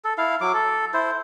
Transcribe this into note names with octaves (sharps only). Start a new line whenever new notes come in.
A4
E4 F5
F#3 D6
A4
E4 C5